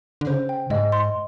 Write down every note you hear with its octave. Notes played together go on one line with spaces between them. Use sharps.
D3
C#3 C5
G5
G#2 D#5
C6